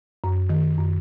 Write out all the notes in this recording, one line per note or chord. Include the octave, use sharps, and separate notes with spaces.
F#2
D#3
F#2